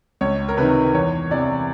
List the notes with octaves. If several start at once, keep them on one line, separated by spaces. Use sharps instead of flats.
C#2 C#5
A#4
C3 D#3 B4
E2 C#5
C3 E3 D5